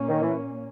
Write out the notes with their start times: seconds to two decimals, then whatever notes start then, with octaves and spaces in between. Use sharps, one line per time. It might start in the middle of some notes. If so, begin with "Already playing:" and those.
Already playing: A#2 A#3 C#4
0.09 D#3
0.22 E3